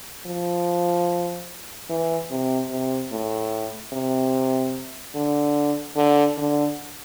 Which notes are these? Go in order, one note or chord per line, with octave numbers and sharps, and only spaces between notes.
F3
E3
C3
C3
A2
C3
D3
D3
D3